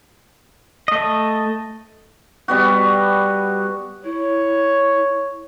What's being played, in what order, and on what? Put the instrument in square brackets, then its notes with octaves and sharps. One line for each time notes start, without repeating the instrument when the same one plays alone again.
[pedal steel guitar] A3 D#5
[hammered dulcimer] G3 B3 F#4
[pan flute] E4 [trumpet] C#5